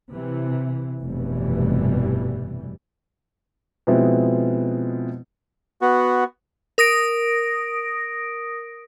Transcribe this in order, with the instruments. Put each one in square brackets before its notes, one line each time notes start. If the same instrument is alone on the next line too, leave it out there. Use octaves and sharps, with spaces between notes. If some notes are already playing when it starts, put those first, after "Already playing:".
[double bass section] C3 E3
F1 G2 B2 E3 G3
[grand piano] B2 F3 G#3 B3 C4 E4
[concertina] B3 F#4
[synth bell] A#4 D#6 A#6 D7